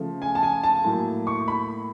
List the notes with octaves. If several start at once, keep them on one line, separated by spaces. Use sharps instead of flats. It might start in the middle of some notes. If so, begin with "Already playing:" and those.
Already playing: C#3 F3 A3
G#5
A5
G#5
A5
A2 F#3 A#3
C#6
B5